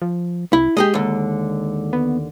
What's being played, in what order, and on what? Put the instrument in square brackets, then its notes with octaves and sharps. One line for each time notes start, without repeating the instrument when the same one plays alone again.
[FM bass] F3
[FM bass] C2 [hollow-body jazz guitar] E4
[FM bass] G#3 [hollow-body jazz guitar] G4 G#4 D#5
[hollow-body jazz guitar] D#2 D3
[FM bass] B3